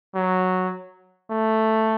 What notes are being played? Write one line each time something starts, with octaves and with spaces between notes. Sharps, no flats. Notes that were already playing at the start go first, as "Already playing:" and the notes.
F#3
A3